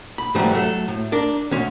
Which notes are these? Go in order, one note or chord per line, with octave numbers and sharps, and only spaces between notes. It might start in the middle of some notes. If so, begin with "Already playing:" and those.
B5
G#2 E3 F#3 G3 A3 C#4
F#3 A3 A4
A2
D4 A#4 D5
D2 C#4 C6